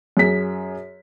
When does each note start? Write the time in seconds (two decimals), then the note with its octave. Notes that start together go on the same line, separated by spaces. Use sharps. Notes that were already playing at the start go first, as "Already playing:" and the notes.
0.17 F#2 G#4 B6